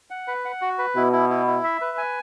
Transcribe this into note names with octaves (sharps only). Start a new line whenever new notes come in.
F#5
B4
F#5
F#4
B4
B2 E4
E4
E4
E4
E5
B4
G#5